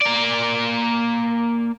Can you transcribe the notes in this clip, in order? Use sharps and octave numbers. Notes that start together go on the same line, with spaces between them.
A#3 D5